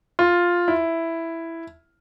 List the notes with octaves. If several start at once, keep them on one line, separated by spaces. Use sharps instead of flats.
F4
E4